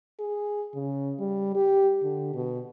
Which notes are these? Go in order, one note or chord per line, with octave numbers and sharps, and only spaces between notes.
G#4
C#3
G3
G4
D3
B2